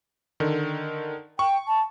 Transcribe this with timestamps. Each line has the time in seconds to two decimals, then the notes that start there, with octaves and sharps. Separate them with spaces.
0.40 D3 D#3
1.39 G5 C#6
1.68 A5